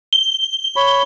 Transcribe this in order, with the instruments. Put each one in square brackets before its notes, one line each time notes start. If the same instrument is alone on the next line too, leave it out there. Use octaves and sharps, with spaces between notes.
[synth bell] G7
[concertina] C#5 B5